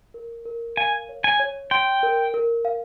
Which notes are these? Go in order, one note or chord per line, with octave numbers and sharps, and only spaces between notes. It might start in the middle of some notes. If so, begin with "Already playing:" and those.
A#4
A#4
F5 G#5
C#5
G#5
C#5
G5 C6
A#4
A#4
F5